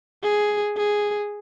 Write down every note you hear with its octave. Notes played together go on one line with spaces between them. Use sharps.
G#4
G#4